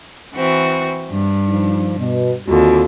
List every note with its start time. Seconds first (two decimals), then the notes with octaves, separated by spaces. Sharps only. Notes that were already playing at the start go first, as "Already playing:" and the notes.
0.33 E3 C4 F#4
1.11 G2
1.48 F3 D#4
1.98 B2
2.48 D#2 D3 C4 F4 F#4